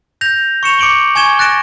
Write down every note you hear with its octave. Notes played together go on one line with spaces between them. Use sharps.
G6 A#6 F7
C#6 C#7 E7 F7
D6 C#7 D7 F#7 G7
G#5 C#6 G#6 E7 G7
F#6 A6 A#6 D7 E7